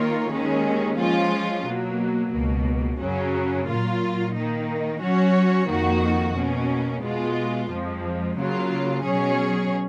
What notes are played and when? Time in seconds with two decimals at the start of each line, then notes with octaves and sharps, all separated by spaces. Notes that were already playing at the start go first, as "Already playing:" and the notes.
Already playing: D#3 A#3 F4 A#4 C#5
0.31 D#2 D#3 G#3 C#4
0.98 F3 G#3 C#4 F4
1.65 B2 F#3 A#3
2.32 C#2 B2 A#3
2.99 F#2 C#3 F#3 C#4
3.67 A#2 F#3 A#3 F4
4.34 D#3 A#3 D#4
5.01 F#3 C#4 F#4 C#5
5.69 F2 D#3 A#3 D#4 F#4
6.36 B2 A#3 C#4
7.02 B2 G#3 B3 F4
7.70 F2 F3 G#3
8.36 C#3 F#3 A#3 F4
9.04 B2 F#3 C#4 G#4 C#5